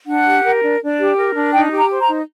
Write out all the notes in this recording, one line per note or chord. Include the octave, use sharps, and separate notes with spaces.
D4 F#5
G4
A#4
D4
D4
G4
A#4
D4
D#4 G5
G4
A#5
C5
A#5
D#4